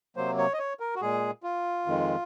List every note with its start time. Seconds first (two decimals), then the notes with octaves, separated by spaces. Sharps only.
0.16 C3 F#3 A#3 C5
0.38 C#5
0.53 D#5
0.59 C#5
0.80 A#4
0.96 F#4
1.01 A#2 G#3 G#4
1.43 F4
1.86 F2 D#3 G#3